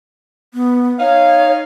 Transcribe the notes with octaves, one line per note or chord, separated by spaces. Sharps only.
B3
D#4 C#5 F5